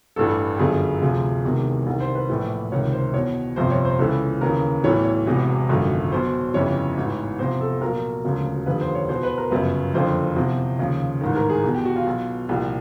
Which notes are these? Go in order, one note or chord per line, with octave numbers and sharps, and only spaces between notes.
A1 G2 E3 A4
G4
G1 F#2 D3 F3 G#4
D2 C3 F3 G#4
E1 E2 C3 D#3
C2 C3 D#3
C5
B4
A#1 A2 E3
C#2 C3 D#3 C#5
C5
E2 B2 C#5
G1 F2 C3 F3 C5
C#5
C5
C#2 C#3 E3 A4
D#2 C#3 E3 A#4
B1 A2 E3 C#5
C#5
E1 E2 C3 E3
G#1 F#2 D3 F3
B1 B2 C5
G1 F2 C#3 E3 C#5
A1 G#2 E3
E2 C3 F3 C5
A4
B1 A#2 F3 A#4
E1 D2 C#3 F3
F1 D#2 D3 F3 B4
C5
C#5
E2 B2 C5
B4
A#4
G1 F#2 C#3 F3 B4
F#1 F2 D3 F3 C5
E2 C3 F3
D#2 C#3 F3
A1 G#2 D#3
A#4
G#4
E2 B2
G4
F#4
F4
B1 B2
C2 A#2 F3 G4